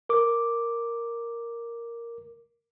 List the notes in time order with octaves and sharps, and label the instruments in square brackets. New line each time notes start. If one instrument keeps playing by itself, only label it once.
[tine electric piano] A#4 D6